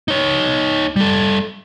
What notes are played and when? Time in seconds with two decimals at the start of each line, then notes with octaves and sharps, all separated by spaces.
0.08 D#4 C#5
0.96 G3 A4